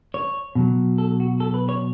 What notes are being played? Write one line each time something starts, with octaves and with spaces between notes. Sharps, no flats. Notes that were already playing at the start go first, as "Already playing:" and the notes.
C#5
B2 F#3
A4
F#4
A4
B4
C#5